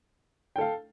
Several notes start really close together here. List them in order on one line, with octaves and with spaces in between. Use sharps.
G5 A4 F5